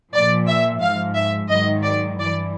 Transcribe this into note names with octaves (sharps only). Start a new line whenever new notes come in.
A#2 F3 D5
E5
G#2 F3 F5
E5
G#2 D#3 F#3 D#5
D5
G2 E3 D5